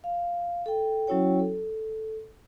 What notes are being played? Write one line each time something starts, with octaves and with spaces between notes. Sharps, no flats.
F5
A4 G5
F#3 C#4 E4 F#4 C#5 G5
A4